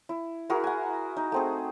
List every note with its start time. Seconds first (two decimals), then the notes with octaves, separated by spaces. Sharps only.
0.09 E4
0.50 E4 F#4 G#4 A#4
0.64 F#5 G#5
1.17 D#4
1.32 A3 C4 G#4